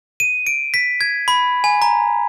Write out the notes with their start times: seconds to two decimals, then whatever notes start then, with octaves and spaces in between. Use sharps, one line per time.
0.20 D#7
0.47 D7
0.74 B6
1.01 G#6
1.28 B5
1.64 G#5
1.82 A#5